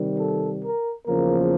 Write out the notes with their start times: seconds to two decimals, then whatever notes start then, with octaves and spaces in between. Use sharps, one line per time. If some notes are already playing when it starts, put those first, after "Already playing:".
Already playing: C3 D#3 G3
0.20 A4
0.63 A#4
1.07 E2 C#3 F3 A#3 A#4